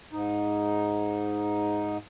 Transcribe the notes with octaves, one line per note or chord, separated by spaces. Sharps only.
G#2 D#4